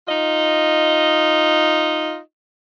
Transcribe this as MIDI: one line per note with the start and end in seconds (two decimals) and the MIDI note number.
0.08 2.18 63
0.08 2.18 65
0.08 2.18 75